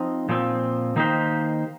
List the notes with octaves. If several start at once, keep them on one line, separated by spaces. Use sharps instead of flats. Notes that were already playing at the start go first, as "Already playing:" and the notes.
Already playing: F3 C4 D#4
A#2 F3 C4
D#3 A#3 D#4 G4 C5